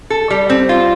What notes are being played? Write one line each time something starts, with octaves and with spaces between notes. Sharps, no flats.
A4
G3
C4
F4